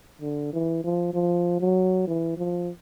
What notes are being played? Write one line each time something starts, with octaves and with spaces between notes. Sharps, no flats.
D3
E3
F3
F3
F#3
E3
F3